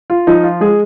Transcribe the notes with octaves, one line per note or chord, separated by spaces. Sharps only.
F4
F3 D#4
F4
G#3 G#4